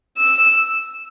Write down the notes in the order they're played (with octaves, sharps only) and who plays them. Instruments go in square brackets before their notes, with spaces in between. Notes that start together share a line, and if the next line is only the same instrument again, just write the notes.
[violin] E6